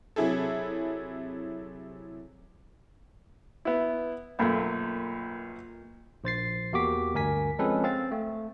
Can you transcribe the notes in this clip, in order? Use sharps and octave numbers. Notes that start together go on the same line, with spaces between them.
C3 F#3 E4 G#4 A4
B3 E4
B1 F#2 A3 A#3 F4
A#1 C5 A6 C7
E2 A#3 F#4 G4 D6 B6
D2 G2 A#4 G#5 B6
F3 G#3 C4 C#4 A4 B4
C4 F5 A6
A3